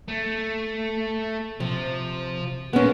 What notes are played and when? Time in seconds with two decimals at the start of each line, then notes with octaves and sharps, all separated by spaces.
0.08 A3
1.60 C3 F3
2.73 G#3 A#3 B3 C#4